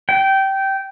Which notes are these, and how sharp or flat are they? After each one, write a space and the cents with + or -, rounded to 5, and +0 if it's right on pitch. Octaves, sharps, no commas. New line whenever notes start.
G5 -15